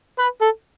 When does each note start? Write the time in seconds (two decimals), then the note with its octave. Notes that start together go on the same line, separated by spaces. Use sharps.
0.19 B4
0.41 A4